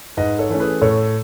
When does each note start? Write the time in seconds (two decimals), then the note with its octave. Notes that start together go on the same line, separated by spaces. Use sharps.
0.17 G#2 B4 D#5
0.39 A4 C#5
0.49 E3 A3 C#4
0.60 G#4 B4
0.82 A2 A4 C#5